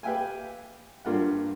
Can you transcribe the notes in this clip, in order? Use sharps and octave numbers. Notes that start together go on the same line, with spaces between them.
G4 B4 E5 F5 G5 G#5
G2 A#3 F4 G4 F#5